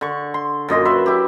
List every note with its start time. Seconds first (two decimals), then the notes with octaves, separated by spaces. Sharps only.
0.01 D3 C#6
0.34 C6
0.69 F#2 A#2 D#5 C6
0.85 F#4 B4 E5 C6
1.06 E4 G4